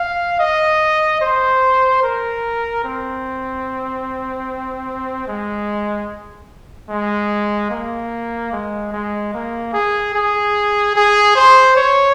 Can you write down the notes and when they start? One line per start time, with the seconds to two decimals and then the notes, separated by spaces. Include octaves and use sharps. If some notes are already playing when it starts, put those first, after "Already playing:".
Already playing: F5
0.39 D#5
1.22 C5
2.03 A#4
2.84 C4
5.28 G#3
6.89 G#3
7.70 A#3
8.52 G#3
8.93 G#3
9.34 A#3
9.73 G#4
10.14 G#4
10.96 G#4
11.36 C5
11.76 C#5